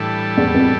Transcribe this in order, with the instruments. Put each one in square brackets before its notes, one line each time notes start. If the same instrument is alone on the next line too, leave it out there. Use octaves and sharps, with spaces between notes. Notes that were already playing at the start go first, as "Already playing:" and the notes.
Already playing: [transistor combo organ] A2 E3 G3 D4 A4
[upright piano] E2
F2